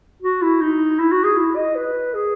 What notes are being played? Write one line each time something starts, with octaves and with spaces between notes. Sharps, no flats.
F#4
E4
D#4
E4
F#4
G#4
E4
D#5
B4
G#4